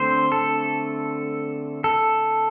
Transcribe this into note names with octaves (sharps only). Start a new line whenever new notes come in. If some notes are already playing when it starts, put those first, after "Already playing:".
Already playing: D3 A3 C4 C5
A4
A4